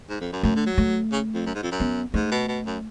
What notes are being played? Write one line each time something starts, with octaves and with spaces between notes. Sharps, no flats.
G#2
F2
F#2
F#2 A3
D3
F#3
A3
C#3
F2
F#2
G#2
F2
F#2
B3
G#2 A3
B2
B2
F#2